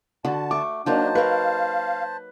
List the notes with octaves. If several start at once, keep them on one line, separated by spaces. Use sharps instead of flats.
D3 F#4 A5
A3 C#6 D6
F#3 A#3 D4 D#4 C5 A5
A#4 B4 F5 C#6